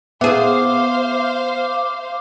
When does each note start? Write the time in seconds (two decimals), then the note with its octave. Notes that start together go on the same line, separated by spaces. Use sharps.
0.21 B3 G#4 C5 E5 F5 D6